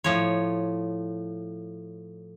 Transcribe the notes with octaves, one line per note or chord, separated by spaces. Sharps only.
A2 F3 C#5